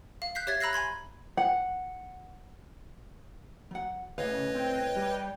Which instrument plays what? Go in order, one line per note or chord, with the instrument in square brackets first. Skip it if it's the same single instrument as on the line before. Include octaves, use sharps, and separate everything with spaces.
[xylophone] F5
F#6 G6 B6 C7
G4 C#5 E5 G#6 A6 B6
A#5 B5 E6 F#6 A#6 C7
G#5 B5 C6 G#6
[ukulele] F#5
[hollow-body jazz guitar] F#3 F#5
[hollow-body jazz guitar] C2 A2 F5 [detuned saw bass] C#3 [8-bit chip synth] B4 C#5 D#5
[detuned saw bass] C4 [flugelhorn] G5
[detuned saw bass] G3